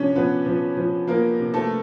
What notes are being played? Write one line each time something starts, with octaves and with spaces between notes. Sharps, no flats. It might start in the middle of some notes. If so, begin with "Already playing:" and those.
Already playing: C3 F3 C#4 D4 C#5
F3 B3 B4
F3
F3
F3 A#3 A#4
C3
A3 A4